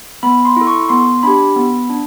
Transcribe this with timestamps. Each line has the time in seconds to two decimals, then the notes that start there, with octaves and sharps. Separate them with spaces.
0.23 B3 B5
0.45 C6
0.56 E4 A4
0.67 C#6
0.89 B3 C6
1.23 D4 G4 B5
1.56 B3
1.90 D4